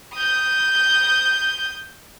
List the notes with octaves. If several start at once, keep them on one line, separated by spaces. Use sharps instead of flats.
D#6 G6